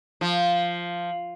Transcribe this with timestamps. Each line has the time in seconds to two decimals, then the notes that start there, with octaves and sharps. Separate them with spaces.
0.21 F3